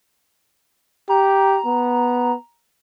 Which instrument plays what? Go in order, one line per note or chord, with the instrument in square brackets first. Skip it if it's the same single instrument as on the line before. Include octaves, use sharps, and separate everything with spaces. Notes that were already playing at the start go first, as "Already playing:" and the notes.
[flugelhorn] G4 [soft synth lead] A#5
[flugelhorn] B3